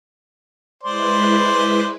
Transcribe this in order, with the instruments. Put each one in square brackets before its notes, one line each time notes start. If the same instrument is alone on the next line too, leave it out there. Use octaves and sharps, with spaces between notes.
[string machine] G#3 E4 B4 [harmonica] C5 D5 C6